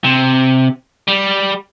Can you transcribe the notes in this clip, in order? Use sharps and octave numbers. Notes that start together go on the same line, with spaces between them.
C3
G3